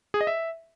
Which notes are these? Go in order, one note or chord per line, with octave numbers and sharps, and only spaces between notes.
G#4
D#5
E5